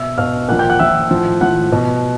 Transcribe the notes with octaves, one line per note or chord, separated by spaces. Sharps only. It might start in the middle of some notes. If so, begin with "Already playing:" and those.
Already playing: B2 E5 E6
B2 F5 F6
A#2 F3 F#5 F#6
G5 G6
F#5 F#6
A#2 F3 E5 E6
A2 F3
A2 F3 F#5 F#6
B2